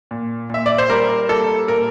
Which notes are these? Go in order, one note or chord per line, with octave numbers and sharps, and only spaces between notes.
A#2
A#2 E5
D5
C5
G3 A#4
A#3 A4
A#2 A#4